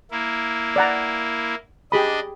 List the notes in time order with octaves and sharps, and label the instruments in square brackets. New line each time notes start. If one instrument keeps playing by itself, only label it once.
[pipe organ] A#3 E4
[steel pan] D5 F#5 A#5
[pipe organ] D4 D#5 [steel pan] G4 G#4 B5